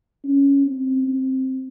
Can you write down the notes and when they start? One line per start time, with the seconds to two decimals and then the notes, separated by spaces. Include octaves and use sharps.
0.24 C#4
0.66 C4
1.08 C4